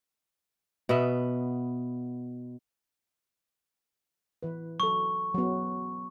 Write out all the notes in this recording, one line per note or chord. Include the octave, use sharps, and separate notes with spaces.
B2 B3 E5
E3 B4
F#3 A4 C#6
F#3 B3